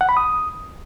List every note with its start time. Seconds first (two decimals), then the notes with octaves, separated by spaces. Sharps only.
0.01 F#5
0.09 B5
0.17 D#6